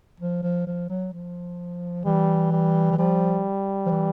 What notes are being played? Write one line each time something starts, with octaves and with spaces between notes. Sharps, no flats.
F3
F3
F3
F#3
F3
E3 G3
G3
E3
F3 G3
F3
E3